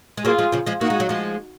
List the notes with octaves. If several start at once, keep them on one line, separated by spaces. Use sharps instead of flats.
G#3
F#3 A#3 F4 G#4
F3 G#3
C#3 F3
F3 G#3
A#3 D#4 F#4
G#3
F#3
F3 G#3